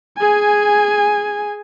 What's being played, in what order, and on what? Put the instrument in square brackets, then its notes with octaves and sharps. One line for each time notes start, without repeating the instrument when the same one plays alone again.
[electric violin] G#4 G#5